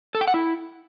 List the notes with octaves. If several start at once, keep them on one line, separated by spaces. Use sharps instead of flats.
A4
G5
F#5
E4